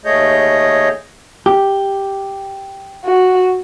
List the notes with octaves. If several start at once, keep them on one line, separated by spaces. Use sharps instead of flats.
D#2 A3 G#4 C#5 D#5 G6
G4
F#4